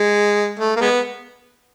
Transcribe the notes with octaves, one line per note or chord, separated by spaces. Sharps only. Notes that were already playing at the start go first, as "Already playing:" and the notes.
Already playing: G#3
A3
A#3
G#3 B3